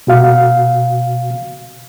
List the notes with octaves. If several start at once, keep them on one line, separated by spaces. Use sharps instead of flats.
B2 F#4 F5